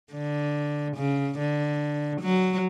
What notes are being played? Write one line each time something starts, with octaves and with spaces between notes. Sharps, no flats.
D3
C#3
D3
F#3